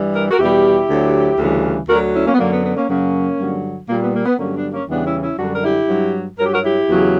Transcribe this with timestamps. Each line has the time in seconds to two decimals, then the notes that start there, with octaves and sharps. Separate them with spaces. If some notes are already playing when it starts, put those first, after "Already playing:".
Already playing: G2 E3 G3
0.15 A#4
0.31 F#4 A#4
0.39 E2 B2 G3 E4 G4
0.89 D2 D3 F#3
1.39 D2 C#3 E3 G3
1.89 D2 D3 F#3 F#4 A#4
2.14 C#4 E4
2.26 A#3 C#4
2.34 B3
2.38 F#2 D3 F#3 A#3
2.52 B3
2.64 B3
2.76 A#3 C#4
2.89 F#2 C#3 F#3 A#3 C#4
3.39 G2 D3 F#3
3.88 A#2 G3 A#3
4.02 B3
4.14 A#3
4.26 B3
4.38 G2 D3 F#3 A#3 C#4
4.55 B3 D4
4.72 A#3 C#4
4.88 E2 C#3 E3 G3 B3 D4
5.05 C#4 E4
5.22 C#4 E4
5.38 F#2 D3 G3 D4 F#4
5.54 A#4
5.63 E4 G4
5.88 G2 F#3
6.38 G2 F#3 A#4
6.45 G4
6.53 F#4 A#4
6.64 E4 G4
6.88 E2 C#3 F#3